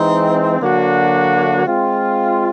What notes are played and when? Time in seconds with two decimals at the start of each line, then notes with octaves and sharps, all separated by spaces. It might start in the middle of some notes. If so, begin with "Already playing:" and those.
Already playing: E3 G#3 C4 D#4
0.61 D3 F#3 A#3 D4 F#4
1.66 G#3 C4 F4